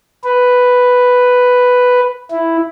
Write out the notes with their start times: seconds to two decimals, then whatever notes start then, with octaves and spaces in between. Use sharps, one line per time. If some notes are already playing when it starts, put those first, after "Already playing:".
0.24 B4
2.31 E4